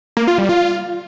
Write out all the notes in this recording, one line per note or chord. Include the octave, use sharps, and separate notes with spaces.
A#3
F4
G3
F4